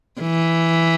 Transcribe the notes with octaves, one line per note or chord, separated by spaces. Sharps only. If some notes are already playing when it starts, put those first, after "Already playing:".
E3